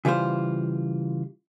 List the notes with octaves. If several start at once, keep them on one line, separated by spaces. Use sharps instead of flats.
C#3 E3 G3 F4 C5